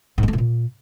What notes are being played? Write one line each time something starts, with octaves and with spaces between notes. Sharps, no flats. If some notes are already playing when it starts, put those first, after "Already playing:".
G#2
G#3
A3
A2
A#2